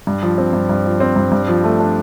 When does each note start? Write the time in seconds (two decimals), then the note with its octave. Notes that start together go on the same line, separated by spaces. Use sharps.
0.07 G2
0.23 F3
0.38 C4
0.53 G2
0.69 G2
0.85 F3
1.00 C4
1.16 G2
1.32 G2
1.48 F3
1.64 A3
1.80 D4